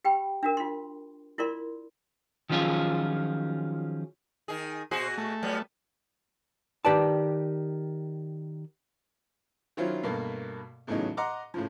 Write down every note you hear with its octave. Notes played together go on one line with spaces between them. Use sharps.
G4 G5 B5
D4 F#4 A#4
F4 C6
E4 F4 A#4 D5 C6
D#3 F3 F#3 C#4 F4 G#4
D#3 G#4
A#2 F#4 G#4 C5
A3
F#3 G3 B3
D#3 G4 B4 D5 A5
D#3 F#3 C#4 E4 F4 C5
G2 B2 A3 A#3
E2 A2 C#3 E3 F#3 D#4
D#5 F#5 A#5 C6 D6
A2 C#3 F3